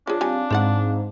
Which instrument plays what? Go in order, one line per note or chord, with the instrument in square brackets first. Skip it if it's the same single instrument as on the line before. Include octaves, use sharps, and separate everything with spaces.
[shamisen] F3 G#4 [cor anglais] D4 [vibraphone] F4 C#5
[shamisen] G3 D#4 G#5 [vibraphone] C4 F5
[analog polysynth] G#2 [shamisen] C5 D5 F#5